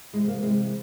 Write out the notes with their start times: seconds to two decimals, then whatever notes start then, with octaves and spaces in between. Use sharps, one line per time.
0.13 C3 E3 G#3
0.28 A#3
0.42 C3 E3 G#3